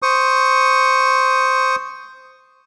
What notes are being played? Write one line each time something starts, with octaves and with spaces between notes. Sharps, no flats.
C5 C#6 D#6